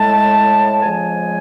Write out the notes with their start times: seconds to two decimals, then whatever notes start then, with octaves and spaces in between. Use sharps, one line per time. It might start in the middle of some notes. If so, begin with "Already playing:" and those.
Already playing: A2 G#3 A5
0.82 F2 C#3 F3 G#3 G#5